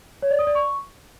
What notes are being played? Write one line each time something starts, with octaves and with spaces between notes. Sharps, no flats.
C#5
D5
D#6
D5
C#6